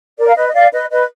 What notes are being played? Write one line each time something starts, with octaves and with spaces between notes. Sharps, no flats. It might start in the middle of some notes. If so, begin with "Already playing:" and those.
A#4 D5
F5
B4 D#5
D#5
D5 F5
B4 D#5
B4 D#5